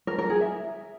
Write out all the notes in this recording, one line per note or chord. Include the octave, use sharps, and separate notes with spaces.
A#4
A#4
G#4
E5